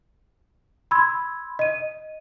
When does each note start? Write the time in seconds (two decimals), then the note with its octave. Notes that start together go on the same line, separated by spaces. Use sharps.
0.91 B5 C6 E6 G#6
1.59 D#5 D#7